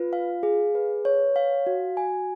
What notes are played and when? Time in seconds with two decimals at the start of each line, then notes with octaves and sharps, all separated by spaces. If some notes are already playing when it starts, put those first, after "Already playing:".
Already playing: F4 B4
0.13 F5
0.43 G#4
0.75 B4
1.05 C#5
1.36 F5
1.67 F#4
1.97 G#5